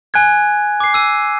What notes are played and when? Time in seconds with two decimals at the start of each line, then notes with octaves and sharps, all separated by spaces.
0.14 G#5 F#6 G#6
0.80 D6 C7
0.94 E6 D#7